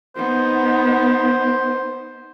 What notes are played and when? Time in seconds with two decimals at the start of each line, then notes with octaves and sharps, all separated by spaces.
0.16 B3 D#4 C5